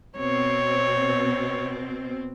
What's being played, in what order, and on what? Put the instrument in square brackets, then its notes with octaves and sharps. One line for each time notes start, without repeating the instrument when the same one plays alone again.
[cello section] B2 C4 [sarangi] C#5